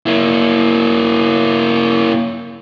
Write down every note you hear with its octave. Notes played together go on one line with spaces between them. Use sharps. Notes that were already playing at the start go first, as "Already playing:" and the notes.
A#3 E4